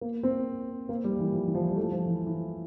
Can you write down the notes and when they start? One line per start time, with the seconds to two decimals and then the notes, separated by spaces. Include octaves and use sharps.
0.01 A#3
0.23 C4
0.89 A#3
1.04 G3
1.19 E3
1.33 F3
1.48 E3
1.55 F3
1.71 G3
1.77 A3
1.92 F3
2.06 E3
2.27 E3